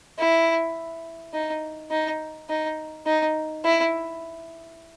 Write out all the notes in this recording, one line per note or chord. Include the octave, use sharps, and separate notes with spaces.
E4
D#4
D#4
D#4
D#4
E4